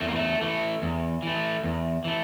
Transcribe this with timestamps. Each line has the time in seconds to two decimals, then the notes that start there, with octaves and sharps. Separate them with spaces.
0.01 E2 A3
0.08 A#3
0.16 A3
0.42 E3 A3
0.82 E2
1.23 E3 A3
1.63 E2
2.04 E3 A3